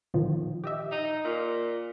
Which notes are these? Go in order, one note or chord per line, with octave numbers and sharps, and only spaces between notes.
A#2 D#3 F3
G4 D#5 E5
D#4
A#2